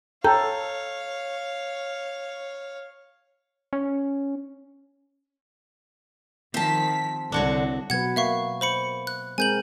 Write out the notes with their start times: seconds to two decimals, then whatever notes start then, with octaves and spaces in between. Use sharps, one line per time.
0.24 A4 C#5 F5 G5 A#5 G6
3.73 C#4
6.54 D#3 F3 C4 A5 B6
7.32 C2 D3 D4 F#4 C#5
7.90 B2 F#3 B4 F#5 G#6
8.16 A#3 B4 E5 F5 C#6
8.61 C5 B5 C#7
9.07 F#6
9.38 G#3 C4 A#4 G#5 G6 F#7